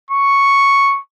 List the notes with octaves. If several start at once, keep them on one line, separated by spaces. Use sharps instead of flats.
C#6